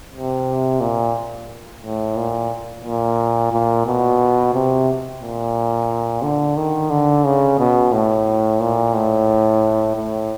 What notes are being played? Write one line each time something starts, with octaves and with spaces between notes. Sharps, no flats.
C3
A#2
A2
A#2
A#2
A#2
B2
C3
A#2
D3
D#3
D3
C#3
B2
A2
A#2
A2
A2